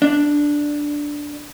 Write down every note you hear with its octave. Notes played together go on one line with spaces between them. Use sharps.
D4